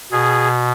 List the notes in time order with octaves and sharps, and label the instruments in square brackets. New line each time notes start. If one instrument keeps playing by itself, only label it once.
[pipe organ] B2 G#4